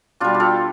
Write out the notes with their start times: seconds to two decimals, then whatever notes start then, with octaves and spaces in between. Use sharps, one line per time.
0.20 B2 G3 D4 F4
0.34 G4
0.40 F4 A4